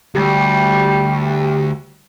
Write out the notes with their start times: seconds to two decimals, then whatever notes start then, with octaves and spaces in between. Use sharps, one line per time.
0.15 D2 G3 G4